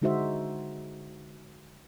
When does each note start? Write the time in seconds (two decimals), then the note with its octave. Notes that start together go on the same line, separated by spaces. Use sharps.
0.02 D3 G#3 D#4 F#4 C5 E5